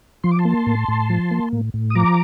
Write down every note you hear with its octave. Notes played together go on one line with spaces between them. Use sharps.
F3 C6
D6
A5 C6
A#3
A2
A2
F3
A#3
A2
A2
D#6
F3 A#5 D6